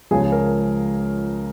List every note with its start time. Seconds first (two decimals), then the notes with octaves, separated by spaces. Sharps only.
0.11 C#2 C#3 F3 G#4
0.32 A#4